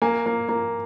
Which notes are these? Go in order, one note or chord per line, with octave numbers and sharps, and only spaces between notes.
A#3 G#5
A#3
A#3